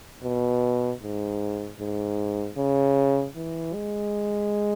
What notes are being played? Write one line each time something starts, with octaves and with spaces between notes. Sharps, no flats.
B2
G#2
G#2
C#3
E3
G#3